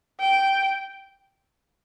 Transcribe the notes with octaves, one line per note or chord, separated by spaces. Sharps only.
G5